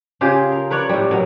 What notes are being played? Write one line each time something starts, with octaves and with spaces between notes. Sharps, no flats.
C#3 F4 G4 G#4
A#4
A#4 B4 C#5 D5
A2 G3
B2 F#3 A#4